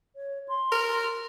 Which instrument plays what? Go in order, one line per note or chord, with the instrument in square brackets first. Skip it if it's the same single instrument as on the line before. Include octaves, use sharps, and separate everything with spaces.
[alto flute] C#5
C6
[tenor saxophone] A#4